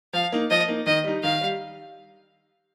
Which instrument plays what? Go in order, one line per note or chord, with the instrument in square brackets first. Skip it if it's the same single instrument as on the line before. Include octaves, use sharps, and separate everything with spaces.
[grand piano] F3 [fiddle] F5
[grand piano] A#3 D#4
[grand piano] F3 [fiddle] D#5
[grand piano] A#3 D#4
[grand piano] D#3 [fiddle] D#5
[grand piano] G3 D#4
[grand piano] D#3 [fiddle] F5
[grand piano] G3